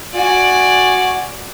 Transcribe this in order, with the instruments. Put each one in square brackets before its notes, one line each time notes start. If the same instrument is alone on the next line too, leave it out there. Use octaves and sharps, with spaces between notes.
[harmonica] F#4 [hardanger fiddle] D5 G#5